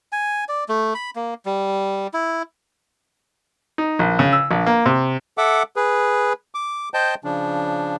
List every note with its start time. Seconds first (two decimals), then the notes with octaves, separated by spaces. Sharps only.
0.12 G#5
0.49 D5
0.69 A3
0.95 B5
1.16 A#3
1.46 G3
2.14 E4
3.78 D#4
3.99 A#1
4.19 C#3
4.32 E6
4.51 A#1
4.66 A#3
4.86 C3
5.38 A4 E5 F#5 D6
5.76 G#4 B4
6.55 D6
6.94 C5 D#5 G5 A5 G6
7.24 C#3 F3 D4